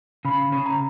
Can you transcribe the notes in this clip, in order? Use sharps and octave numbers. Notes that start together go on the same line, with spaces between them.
C#3 B5
C#3
A#5